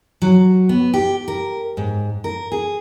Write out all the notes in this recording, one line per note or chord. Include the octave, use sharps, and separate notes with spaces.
F#3
B3
G4
A#4
G#2
A#4
G#4